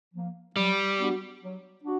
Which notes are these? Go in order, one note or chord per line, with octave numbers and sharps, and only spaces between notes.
F3 A#3
F#3 G3
B3 D4 F#4
F#3
D4 F#4